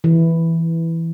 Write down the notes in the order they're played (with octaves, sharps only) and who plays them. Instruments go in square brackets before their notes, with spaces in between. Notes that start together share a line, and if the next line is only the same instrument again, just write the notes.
[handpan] E3